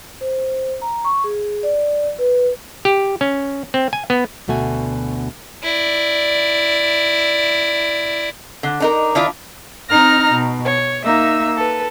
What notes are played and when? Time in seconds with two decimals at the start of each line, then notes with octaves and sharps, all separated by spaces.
0.21 C5
0.82 A#5
1.04 C#6
1.24 G#4
1.63 D5
2.19 B4
2.85 G4
3.21 C#4
3.74 C4
3.93 G#5
4.10 B3
4.48 D2 B2 A3 F#4 G#5
5.63 E4 D5
8.63 D3
8.80 D4 D#4 A#4
9.15 D#3 D4 E4 F4
9.89 C4 D#4 A#5 F6 A#6
10.33 B2
10.65 C#5
11.04 A#3 D#4 E5 E6
11.58 A4 B4